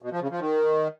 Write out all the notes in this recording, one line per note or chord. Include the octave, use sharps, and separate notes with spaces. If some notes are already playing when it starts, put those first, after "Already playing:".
B2
F3
C#3
F3
D#3